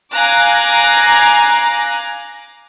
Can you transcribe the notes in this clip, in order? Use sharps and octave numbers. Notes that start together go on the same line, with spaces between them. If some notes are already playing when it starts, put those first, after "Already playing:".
F5 G#5 A#5 D6 F#6